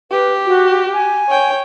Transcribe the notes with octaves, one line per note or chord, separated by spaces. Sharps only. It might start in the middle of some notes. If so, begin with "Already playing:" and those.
G4 B4
F#4
G#5
C#5 G5